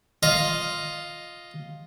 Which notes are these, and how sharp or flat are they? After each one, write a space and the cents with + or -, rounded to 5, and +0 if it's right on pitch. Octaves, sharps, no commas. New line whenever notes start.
F4 +0 D#5 +0